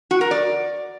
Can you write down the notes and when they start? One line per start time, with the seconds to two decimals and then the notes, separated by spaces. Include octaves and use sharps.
0.11 F#4
0.21 A#4
0.31 D5